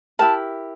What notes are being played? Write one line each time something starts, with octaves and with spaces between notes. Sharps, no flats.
E4 G4 A#4 A5